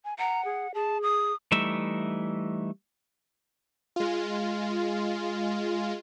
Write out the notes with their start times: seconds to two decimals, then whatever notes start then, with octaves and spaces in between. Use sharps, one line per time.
0.05 G#5
0.19 F#5 A#5
0.45 G#4
0.74 G#4 A5
1.03 D#6
1.52 E3 G3 A3 D#4 E5
3.96 G#3 F4